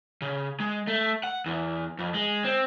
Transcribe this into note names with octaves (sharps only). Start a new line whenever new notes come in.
C#3
G#3
A3
F#5
E2
F2
G#3
C4